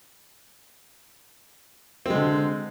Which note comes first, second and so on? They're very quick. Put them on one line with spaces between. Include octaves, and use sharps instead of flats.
C4 G#3 D3